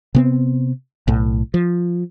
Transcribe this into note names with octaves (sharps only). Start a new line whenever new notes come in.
C3 B3 C4
B1 A2
F3